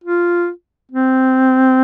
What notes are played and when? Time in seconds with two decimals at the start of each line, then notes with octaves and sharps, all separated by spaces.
0.04 F4
0.91 C4